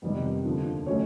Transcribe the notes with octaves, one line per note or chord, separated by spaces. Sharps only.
F2 C3 D#3 G3 B3 B4
D#2 D3 F3
D#3 F#3 A3 C#4 C#5